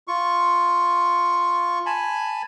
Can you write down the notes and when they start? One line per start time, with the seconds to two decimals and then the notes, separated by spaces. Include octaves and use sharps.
0.08 F4 C#6
1.86 G#5 A5 B5